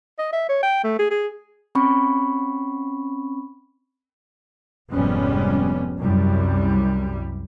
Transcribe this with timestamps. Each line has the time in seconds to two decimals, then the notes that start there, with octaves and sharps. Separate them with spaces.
0.19 D#5
0.33 E5
0.49 C#5
0.63 G5
0.84 A3
0.99 G#4
1.11 G#4
1.75 C4 C#4 B5 C#6
4.92 F1 F2 G#2 G3 B3 C#4
5.98 C2 F#2 G3